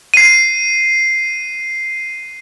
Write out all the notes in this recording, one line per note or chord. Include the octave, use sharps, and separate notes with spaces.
C7 D#7